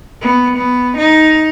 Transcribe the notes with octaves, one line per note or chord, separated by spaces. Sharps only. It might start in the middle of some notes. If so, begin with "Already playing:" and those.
B3
B3
D#4